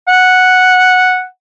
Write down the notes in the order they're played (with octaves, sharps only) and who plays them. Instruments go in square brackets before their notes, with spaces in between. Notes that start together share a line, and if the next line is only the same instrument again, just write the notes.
[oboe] F#5